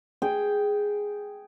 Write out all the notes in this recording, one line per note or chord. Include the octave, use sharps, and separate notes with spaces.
G#4 G5